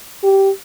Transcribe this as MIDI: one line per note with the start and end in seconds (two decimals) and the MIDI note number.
0.23 0.50 67